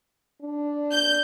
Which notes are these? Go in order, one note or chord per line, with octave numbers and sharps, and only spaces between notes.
D4
G6